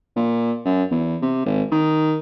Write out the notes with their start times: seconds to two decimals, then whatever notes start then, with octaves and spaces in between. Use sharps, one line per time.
0.16 A#2
0.65 F#2
0.91 E2
1.22 C3
1.46 G#1
1.72 D#3